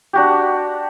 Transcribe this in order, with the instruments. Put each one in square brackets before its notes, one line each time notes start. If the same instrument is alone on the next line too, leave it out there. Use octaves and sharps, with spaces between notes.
[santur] D4 F#4 G4